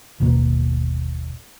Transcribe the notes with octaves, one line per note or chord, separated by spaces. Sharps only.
G1 D#2 B2 A#3